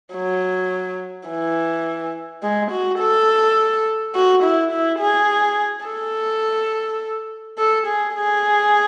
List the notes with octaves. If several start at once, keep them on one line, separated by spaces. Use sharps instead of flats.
F#3
E3
G#3
F#4
A4
F#4
E4
E4
G#4
A4
A4
G#4
G#4